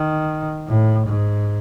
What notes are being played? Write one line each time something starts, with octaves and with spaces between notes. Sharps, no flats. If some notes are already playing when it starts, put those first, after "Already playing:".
Already playing: D#3
A2
G#2